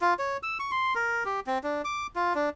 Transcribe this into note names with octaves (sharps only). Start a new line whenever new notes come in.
F4
C#5
E6
C#6
C6
A#4
G4
C4
D4
D6
F4
D4